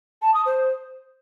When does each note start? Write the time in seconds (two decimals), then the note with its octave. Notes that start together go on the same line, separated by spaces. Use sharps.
0.22 A5
0.34 D#6
0.46 C5